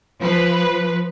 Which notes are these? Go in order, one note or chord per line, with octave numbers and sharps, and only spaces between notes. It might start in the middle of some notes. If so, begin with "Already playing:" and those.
F3 B4